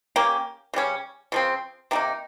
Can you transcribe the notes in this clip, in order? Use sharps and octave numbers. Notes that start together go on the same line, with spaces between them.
A#3 C#4 G4
C#3 G3 C#4
C#3 F3 C4
C3 D#3 A#3 D#4